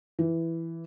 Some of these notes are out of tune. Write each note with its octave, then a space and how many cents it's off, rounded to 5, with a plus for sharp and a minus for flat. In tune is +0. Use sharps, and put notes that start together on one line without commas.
E3 +5